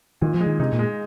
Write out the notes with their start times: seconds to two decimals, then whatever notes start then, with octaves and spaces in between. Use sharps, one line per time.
0.21 A#2 D#3
0.34 F3
0.41 G#3
0.46 D#3
0.60 C3 D#4
0.73 A#2
0.79 G#3